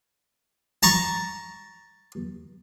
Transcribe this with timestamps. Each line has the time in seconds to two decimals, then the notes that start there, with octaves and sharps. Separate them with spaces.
0.83 A5 A#5 C#6